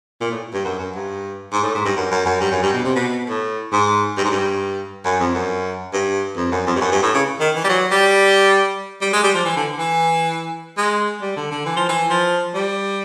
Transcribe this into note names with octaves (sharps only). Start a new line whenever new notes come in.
A#2
A2
G2
F#2
F#2
G2
G#2
A2
G#2
G2
F#2
F#2
F#2
G2
F#2
G2
B2
C3
B2
A2
G#2
G2
G#2
G2
F#2
F2
F#2
G2
F2
F#2
F2
G2
F#2
G2
A2
C#3
D#3
E3
G3
F#3
G3
G3
G#3
G3
F3
E3
D3
E3
G#3
G3
D3
D3
E3
F3
E3
F3
G3